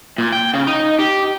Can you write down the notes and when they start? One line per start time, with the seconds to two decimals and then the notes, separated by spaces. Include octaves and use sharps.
0.18 A#2
0.33 G5
0.54 C#3
0.67 D#4
0.99 G4